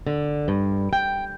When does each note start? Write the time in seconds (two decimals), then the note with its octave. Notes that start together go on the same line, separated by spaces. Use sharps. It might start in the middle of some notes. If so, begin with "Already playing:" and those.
0.07 D3
0.48 G2
0.93 G5